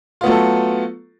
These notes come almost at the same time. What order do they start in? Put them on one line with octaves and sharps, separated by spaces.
F4 B3 A3 F#3 A4